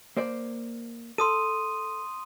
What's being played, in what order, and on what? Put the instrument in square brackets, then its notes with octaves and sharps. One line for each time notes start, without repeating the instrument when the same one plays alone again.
[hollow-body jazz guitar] A#3 C5 D5
[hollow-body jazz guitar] A4 [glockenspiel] C6 D#6 D#7